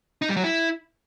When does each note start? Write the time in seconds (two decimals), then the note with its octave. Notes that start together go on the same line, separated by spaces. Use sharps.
0.22 D#4
0.29 G3
0.37 F#3
0.44 E4